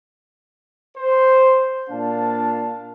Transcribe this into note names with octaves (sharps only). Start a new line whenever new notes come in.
C5
A#2 D4 F5 A5